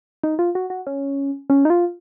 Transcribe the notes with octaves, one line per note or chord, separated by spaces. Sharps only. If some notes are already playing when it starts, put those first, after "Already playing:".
D#4
F4
F#4
F#4
C#4
C#4
D#4
F4